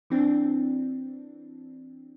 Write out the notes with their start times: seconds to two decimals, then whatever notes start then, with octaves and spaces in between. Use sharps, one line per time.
0.10 E3 C4 D4